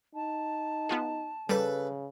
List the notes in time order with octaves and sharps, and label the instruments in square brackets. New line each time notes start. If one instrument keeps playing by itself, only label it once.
[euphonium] D#4 [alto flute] A5
[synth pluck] B3 F4 G#4
[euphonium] C#3 [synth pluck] G3 [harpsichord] A4 B4